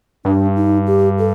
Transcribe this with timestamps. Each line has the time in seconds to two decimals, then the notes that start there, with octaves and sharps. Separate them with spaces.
0.25 G2 D4
0.56 D#4
0.87 G4
1.19 A4